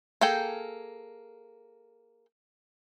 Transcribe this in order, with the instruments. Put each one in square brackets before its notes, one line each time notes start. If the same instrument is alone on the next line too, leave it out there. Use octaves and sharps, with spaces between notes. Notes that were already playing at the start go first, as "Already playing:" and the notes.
[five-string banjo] A#3 G#4 A4 G5